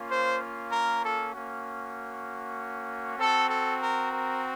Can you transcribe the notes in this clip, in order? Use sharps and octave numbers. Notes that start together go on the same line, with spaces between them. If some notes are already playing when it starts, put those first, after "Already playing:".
Already playing: A#3 C#4 F4
C5
A#4
A4
A#3 C#4 F#4
C4 F#4 A4
A4
A#4
A#4